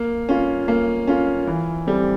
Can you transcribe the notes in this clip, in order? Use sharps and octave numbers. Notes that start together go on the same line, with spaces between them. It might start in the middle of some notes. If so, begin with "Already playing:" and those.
Already playing: A#3
C#4 F4
A#3
C#4 F4
E3
G3 C4